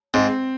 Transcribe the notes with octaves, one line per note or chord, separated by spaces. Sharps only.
G#2 C4